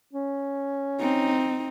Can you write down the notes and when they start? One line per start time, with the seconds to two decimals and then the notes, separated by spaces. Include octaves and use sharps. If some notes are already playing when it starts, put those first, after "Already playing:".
0.13 C#4
1.00 C4 D#4